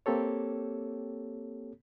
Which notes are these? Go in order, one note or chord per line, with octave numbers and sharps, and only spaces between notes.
A#3 C4 G4 A4 C#5